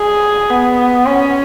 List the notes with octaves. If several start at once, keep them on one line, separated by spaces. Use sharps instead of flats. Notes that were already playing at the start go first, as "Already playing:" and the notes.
Already playing: G#4
B3
C#4